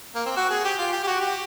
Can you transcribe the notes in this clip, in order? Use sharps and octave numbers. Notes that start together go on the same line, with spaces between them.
A#3
C4
F#4
G#4
G4
F4
G4
G4
F#4
G4